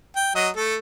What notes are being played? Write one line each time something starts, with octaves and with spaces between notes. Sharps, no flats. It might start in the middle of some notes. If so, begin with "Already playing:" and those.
G5
F#3 D#5
A3 A4